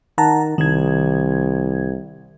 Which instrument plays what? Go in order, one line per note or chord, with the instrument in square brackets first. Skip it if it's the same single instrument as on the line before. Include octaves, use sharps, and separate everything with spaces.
[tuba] D#3 [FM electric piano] F#5 A5 A#5
[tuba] C2 [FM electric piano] D#3 G#6